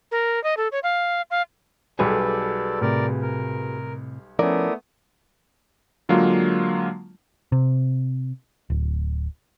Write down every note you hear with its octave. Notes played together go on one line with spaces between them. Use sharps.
A#4
D#5
A4
C#5
F5
F5
B1 G3 F#4 G#4 A4 B4 D5
A2 C3 A#4 D5
A#4
F3 A3 B3 C#4 E4 A#4 D5 D#6
D3 F#3 G#3 A#3 F4
C3
D1